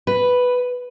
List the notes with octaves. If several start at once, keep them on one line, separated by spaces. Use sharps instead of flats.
B4